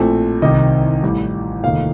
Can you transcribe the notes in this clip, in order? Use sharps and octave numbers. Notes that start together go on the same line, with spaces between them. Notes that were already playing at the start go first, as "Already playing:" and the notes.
Already playing: A#1 A2 F3 A3 C4
C2 C3 D#3 D#5
A1 A2 G3
F1 D#2 D#3 F5